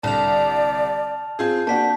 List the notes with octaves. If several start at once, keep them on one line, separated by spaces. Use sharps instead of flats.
C2 D3 D5 A5 F6 F7
C4 F4 G#4 G6
A#3 D4 F#4 A5 B6